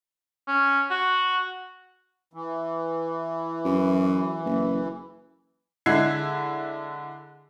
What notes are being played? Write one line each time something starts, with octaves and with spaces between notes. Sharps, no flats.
C#4
F#4
E3
F#2
F#1
D3 G#3 E4 F#6 G#6 C7